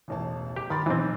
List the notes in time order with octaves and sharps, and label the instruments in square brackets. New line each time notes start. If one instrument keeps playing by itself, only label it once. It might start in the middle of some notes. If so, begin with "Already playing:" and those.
[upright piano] E1 A1 A5
[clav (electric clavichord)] G4 [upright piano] D6
[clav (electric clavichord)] D#3 [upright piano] B5 C6 A6
[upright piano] B1 [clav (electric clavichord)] E3 C4